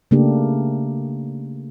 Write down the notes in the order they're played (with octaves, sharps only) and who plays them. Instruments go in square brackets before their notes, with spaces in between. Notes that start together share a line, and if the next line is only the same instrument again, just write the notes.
[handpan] C#3 A3 A#3 D4 G4